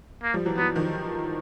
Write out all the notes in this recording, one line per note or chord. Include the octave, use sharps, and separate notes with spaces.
A#3
F3 G3
E3 F#3
E3 F#3 B3
D#3 F3